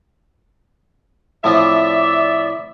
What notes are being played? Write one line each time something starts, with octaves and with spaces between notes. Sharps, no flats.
A2 F3 C4 D5 E5